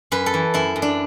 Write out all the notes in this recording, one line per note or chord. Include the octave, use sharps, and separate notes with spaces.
F#2 B4
A4
E3
F#2 E4
F#2
D4